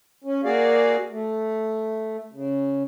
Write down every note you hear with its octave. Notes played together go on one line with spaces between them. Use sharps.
C#4
A#3 F#4 G#4 D5 F5
A3
C#3